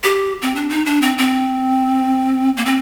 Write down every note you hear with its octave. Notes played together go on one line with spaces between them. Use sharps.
G4
C4
D4
D#4
D4
C4
C4
A#3
C4